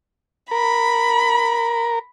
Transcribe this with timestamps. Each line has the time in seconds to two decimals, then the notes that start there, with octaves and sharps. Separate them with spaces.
0.51 A#4 B5